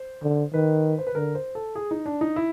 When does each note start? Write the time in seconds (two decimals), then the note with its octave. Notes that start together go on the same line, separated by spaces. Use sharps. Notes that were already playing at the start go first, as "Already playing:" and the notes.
Already playing: C5
0.23 D3
0.53 D#3 B4
0.98 C5
1.07 B4
1.15 D3 A#4
1.35 C5
1.55 A4
1.75 G#4
1.91 D#4
2.06 D4
2.21 D#4
2.36 E4